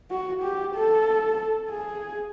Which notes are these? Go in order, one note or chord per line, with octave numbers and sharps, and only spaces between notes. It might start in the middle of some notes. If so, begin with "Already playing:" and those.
F#4
G4
A4
G#4